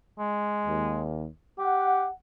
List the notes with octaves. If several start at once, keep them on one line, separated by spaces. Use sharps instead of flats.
G#3
D#2
G4 F#5